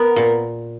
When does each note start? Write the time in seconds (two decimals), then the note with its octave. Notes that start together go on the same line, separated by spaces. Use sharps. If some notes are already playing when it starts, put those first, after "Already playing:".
Already playing: B3 A#4
0.16 A#2